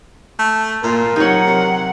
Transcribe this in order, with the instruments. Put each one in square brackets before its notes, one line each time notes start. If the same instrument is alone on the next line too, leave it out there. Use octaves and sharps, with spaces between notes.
[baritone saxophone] A3
[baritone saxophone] A#2 [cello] A#3 F4 [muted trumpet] A#4
[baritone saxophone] C3 [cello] F#3 F#5 [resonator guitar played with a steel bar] D#4 C#5
[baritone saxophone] C3